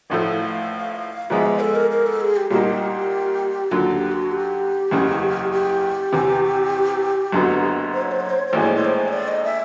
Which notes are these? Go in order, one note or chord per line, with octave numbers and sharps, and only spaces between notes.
A1 A2 F3 A3 F5
G#2 F3 G#3 B3 E5
D#5
A4
A#4
A#4
A4
G#4
G4
C2 A#2 G3 A#3 D#4 G4
D#2 D3 F#3 F4
G4
F#4
G4
F#1 E2 C#3
G4
E2 C3 E3
F#1 F#2 D3 F#3 B3
C5
C#5
C5
C#5
C5
C#5
C5
A#1 A2 E3 G#3 C#5
C5
C#5
C5
C#5
D5
D#5
E5